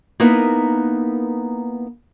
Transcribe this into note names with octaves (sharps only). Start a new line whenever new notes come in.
A#3 B3 D#4 E4 A#4 B4